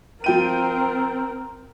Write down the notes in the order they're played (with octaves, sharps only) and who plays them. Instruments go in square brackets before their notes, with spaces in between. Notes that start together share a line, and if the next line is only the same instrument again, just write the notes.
[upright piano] F3 G5 D#7 [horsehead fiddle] C4 A#4